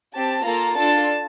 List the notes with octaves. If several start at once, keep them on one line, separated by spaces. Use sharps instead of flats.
C4 G4 A5
A#3 F4 A4 A#5
D4 F4 A4 A5